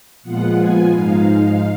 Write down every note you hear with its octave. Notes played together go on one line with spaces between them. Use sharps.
A#2 F3 G#3 B3 F4 F#5
G#5
G#2 F3 G#3 D#4 F5